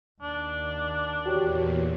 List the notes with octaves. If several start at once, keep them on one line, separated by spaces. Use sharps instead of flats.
D#2 D4
E2 A#2 F#4 G4 C#5